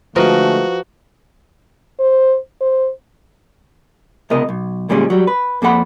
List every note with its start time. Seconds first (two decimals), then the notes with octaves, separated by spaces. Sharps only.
0.16 D3 F3 G#3 A3 F#4 A#4 B4 D#5
1.99 C5
2.61 C5
4.30 C#2 C3 B3 A#4 D#5
4.49 B1
4.89 D2 A#2 G3 G#3 C#4
5.10 F#3 G3
5.27 B4
5.62 F2 A#3 A4 F#5 B5